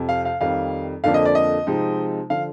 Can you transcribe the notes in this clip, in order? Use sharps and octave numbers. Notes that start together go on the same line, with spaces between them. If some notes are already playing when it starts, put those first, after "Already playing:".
Already playing: F2 C3 F3
F5
F5
F2 D#3 G3 F5
F2 D3 F3 A#3 D4 F5
D#5
D5
D#5
C3 F3 G#3 C4 D#4
D3 F3 F5